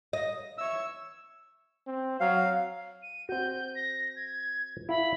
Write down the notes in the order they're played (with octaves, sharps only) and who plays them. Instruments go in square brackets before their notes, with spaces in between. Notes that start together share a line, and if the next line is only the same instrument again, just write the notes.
[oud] D#5
[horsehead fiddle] C#5 E5 [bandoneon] E6
[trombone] C4
[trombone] F#3 [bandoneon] F5
[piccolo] D#7
[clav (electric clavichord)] C4 F#4 [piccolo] G6
[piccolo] A#6
G#6
[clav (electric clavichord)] E4 F5 [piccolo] B5